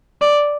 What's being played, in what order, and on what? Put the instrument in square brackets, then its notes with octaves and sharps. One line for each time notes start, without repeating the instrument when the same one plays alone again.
[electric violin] D5